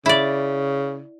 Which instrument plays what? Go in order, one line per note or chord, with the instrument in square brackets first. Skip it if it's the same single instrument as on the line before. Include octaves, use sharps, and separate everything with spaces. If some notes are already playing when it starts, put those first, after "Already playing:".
[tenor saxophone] C#3 [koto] E4 D5